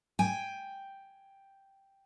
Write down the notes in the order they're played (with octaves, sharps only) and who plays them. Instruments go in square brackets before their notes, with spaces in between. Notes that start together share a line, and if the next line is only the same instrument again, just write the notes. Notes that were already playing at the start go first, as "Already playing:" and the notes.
[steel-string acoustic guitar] G5 G#5